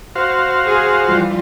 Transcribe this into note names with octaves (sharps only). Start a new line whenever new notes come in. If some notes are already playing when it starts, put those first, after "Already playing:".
F#4 C5 F5
G#4
E3 G3 F4